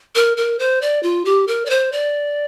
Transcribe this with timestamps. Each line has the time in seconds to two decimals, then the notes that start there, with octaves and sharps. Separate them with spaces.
0.15 A#4
0.37 A#4
0.59 C5
0.82 D5
1.03 F4
1.25 G4
1.48 A#4
1.66 D5
1.70 C5
1.92 D5